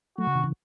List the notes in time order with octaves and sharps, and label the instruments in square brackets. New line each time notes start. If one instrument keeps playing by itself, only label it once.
[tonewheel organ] F#3 A3 [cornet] F#4
[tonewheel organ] C#3
C3 D#3
C#3 E3